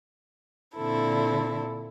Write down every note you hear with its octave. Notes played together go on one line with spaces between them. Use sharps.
A#2 D3 C4 E4 A4